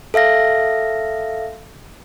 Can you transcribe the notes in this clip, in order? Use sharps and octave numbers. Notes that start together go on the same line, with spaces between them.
A4 E5 F5 A#6